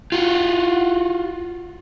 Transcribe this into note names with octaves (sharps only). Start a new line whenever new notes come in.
F4 F#4